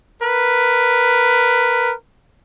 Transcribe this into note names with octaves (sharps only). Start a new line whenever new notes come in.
A#4 B4